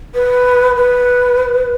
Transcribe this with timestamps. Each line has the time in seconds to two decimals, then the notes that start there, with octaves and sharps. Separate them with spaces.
0.14 B4
0.76 B4